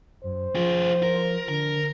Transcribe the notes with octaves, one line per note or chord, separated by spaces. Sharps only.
F#2 C5
F3 F4 G#4
A#4
D3 A#4